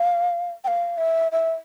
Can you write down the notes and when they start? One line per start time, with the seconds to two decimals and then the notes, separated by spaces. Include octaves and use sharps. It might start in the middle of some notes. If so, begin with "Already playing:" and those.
Already playing: F5
0.64 G5
0.67 F5
0.97 E5
1.32 E5